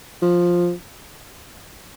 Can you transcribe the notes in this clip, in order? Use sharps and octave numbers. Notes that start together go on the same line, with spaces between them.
F3